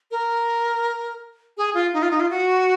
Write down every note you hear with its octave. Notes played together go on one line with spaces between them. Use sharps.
A#4
G#4
F4
D#4
F4
D#4
F4
F#4